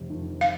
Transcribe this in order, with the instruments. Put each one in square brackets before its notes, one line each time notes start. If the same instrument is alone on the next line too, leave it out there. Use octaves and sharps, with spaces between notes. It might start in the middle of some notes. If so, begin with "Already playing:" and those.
Already playing: [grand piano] F1
F2 D#3
[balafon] F5